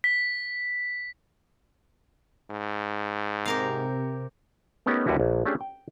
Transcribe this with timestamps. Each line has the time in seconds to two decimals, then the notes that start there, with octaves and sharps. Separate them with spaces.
0.04 B6
2.50 G#2
3.45 C3 G4 A#4 F5
4.86 A3 B3 C#4 D#4 G4 A#4
5.06 D#2 D3 G3 E4 F#4 B4
5.20 A#1
5.45 A3 C#4 D4 G4 G#4
5.61 G5